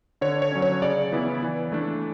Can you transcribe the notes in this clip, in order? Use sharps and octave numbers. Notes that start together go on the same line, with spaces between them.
D3 C#5
C#5
F#3 C#4
C#5
C#3 D5
E3 B3 E4
E3
A3 D4